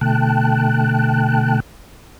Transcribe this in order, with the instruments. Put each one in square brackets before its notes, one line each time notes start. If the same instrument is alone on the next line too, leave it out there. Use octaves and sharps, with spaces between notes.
[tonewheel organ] B2 D3 A3 G5 A5 F#6